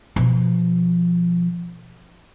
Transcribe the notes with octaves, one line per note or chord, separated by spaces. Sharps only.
B2 F3